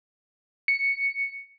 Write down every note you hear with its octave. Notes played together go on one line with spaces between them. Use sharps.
C#7